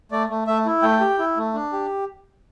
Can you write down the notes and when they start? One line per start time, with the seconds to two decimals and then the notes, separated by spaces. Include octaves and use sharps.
0.12 A3 D5
0.29 A3
0.47 A3 E5
0.66 E4
0.82 A3 G5
1.00 G4
1.19 E4
1.37 A3
1.54 D4
1.72 G4